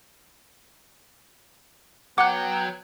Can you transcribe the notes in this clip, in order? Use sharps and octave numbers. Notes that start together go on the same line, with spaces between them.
F#3 B3 F#5 G5 D6 F#6